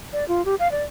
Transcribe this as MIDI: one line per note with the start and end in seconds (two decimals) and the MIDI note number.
0.13 0.26 74
0.28 0.45 65
0.45 0.55 67
0.59 0.70 77
0.72 0.83 74